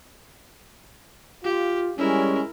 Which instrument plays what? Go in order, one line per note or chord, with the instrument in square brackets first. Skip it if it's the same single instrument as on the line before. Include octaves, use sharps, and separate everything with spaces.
[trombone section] F4 [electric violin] G4
[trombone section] G3 G#3 C#4 [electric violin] E4 A#4